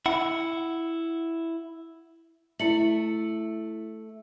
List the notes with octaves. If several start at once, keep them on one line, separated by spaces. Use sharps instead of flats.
E4 F#5
A3 E4 C#7 F#7